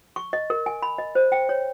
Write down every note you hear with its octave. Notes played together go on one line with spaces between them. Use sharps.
C#6
D#5
A#4
G#5
B5
D#5
C5
G5
C#5